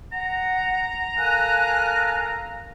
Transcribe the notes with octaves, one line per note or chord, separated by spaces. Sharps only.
F#5 A#5
A4 A#4 F5 G#5 F#6